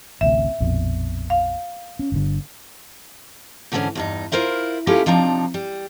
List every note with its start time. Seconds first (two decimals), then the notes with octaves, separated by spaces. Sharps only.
0.21 A1 D2 C3 E5
0.60 A#1 F2 B2
1.30 F5
1.99 C#4
2.12 G1 D3
3.72 G#2 D3 E3 A#3 C#4 D4
3.95 E2 G2 D#4
4.32 E4 F4 A#4 C5 E5
4.87 A#3 C#4 E4 F4 G4 A4
5.06 C3 F3 D4 D#4 A#5
5.54 G3